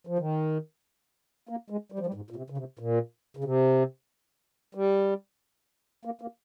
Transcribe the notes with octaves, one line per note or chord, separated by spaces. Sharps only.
F3
D#3
A#3
G#3
G3
F3
G3
G#2
A#2
C3
C#3
C3
A#2
C#3
C3
G3
A#3
A#3